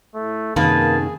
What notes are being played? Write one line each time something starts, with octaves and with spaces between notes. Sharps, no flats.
A2 A3
F#2 C3 D#3 A#3 G#4 B4 A5